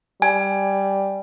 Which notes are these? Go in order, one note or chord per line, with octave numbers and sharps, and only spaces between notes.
G3 G#5